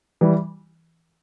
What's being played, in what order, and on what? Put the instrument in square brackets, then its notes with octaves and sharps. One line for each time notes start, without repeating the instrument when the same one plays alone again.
[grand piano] E3 G3